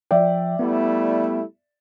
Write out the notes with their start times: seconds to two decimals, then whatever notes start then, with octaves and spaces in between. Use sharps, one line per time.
0.11 F3 D5 E5 G5
0.59 G3 A3 B3 E4